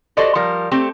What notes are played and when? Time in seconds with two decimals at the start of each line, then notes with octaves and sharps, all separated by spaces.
0.17 F#4 G4 A4 C5 D5 D#5
0.35 F3 G3 A#4
0.71 A3 C4 G4